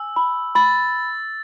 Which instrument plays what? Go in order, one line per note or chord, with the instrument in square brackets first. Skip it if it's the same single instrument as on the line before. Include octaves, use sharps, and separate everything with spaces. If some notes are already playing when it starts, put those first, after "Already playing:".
Already playing: [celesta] G#5 [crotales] E6
[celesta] B5
[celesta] B5 [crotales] A6